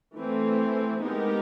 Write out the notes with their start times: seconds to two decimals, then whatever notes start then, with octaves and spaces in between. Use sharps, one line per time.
0.17 E3 A3 C4
1.03 G#3 B3 D#4 G4 A#4